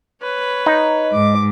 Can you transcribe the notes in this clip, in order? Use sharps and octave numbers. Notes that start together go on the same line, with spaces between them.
B4 C#5
D#4
G#2 D6